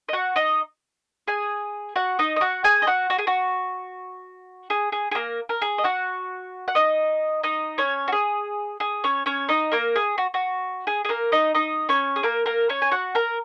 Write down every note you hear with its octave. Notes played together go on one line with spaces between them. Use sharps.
D#5
F#4 F#5
D#4 D#5
G#4 G#5
F#4 F#5
D#4 D#5
D#5
F#4 F#5
G#4 G#5
D#5
F#4 F#5
F#4
G#4
F#4
G#4
G#4
G#4
A#3 A#4
A#4
G#4
D#5
F#4 F#5
F#5
D#4 D#5
D#4 D#5
C#4 C#5
F#4
G#4
G#4
C#4 C#5
C#4 C#5
D#4 D#5
A#3 A#4
G#4
F#4
F#4
G#4
G#4
A#3 A#4
D#4 D#5
D#4 D#5
C#4 C#5
G#4
A#3 A#4
A#3 A#4
C#4 C#5
G#5
F#4 F#5
A#4 A#5